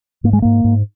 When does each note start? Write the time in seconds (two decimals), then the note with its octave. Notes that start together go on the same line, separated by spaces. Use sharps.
0.24 G#2 A#3
0.33 G#3
0.42 G#2 A#3
0.64 G#2